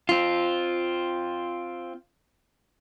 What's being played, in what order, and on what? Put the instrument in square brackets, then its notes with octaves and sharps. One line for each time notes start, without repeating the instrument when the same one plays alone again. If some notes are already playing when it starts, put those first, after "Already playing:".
[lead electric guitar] C4 F4